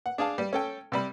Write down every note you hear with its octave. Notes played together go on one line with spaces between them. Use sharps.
F#5
D4 G#4 F5 A5
G3
C#4 A4 G5
C3 G3 B5